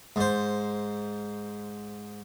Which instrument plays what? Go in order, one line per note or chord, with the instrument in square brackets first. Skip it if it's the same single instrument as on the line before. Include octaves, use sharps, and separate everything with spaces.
[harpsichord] G#2 C5